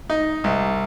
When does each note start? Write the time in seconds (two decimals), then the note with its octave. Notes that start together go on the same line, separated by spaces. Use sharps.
0.10 D#4
0.44 C2